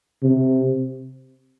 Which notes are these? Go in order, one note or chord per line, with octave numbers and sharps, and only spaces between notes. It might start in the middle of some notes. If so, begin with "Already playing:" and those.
C3